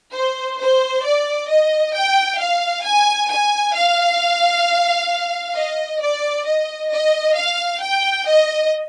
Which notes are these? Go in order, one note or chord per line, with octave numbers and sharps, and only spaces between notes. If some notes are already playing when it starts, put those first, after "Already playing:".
C5
C5
D5
D#5
G5
F5
G#5
G#5
F5
D#5
D5
D#5
D#5
F5
G5
D#5